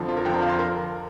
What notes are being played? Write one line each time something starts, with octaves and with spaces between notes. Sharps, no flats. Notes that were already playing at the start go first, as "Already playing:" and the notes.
Already playing: F2 D3 F3
F4
A#4
F2 D3 F3 G5
A#5
F5
C6
A#4